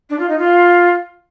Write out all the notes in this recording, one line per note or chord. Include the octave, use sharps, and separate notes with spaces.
D4
F4
D#4
F4